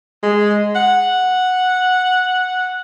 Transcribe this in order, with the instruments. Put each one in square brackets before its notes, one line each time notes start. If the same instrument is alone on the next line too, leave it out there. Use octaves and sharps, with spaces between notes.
[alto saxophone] G#3
F#5